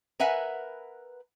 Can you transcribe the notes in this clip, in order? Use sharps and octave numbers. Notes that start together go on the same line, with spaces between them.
A#4 B4 E5 F#5 G#5